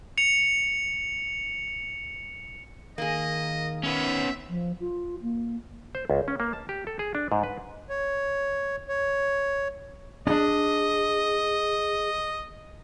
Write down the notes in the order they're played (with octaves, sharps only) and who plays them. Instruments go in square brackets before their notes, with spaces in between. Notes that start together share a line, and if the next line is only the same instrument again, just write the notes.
[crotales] C#7 F7
[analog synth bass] D#3 [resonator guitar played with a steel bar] A#3 G#4 [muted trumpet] D#5
[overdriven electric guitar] B3 C#4 [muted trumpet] E5
[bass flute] F3
F4
A#3
[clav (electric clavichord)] C5
C#2
C#4
A#3
A5
G4
A4
G#4
D4
G#2
B4
[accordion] C#5
C#5
[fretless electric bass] C#4 D4 [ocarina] G#4 [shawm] D#5